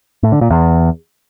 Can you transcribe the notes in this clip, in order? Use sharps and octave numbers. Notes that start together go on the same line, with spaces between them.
A2
D3
A#2
E2